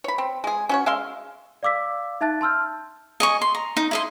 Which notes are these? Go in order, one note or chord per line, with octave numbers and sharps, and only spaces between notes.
C#5 B5
C4
G#3 G#4
C#4 F#4 C#5
G#3 E5 F5 C6
D5 F5 D6 E6 B6
D#4 E5 A5 F#6 A6
A5 C6 E6 F6 G6
D#5 G#5 C#6
C6
A#5
D#4
E4 D#5 C6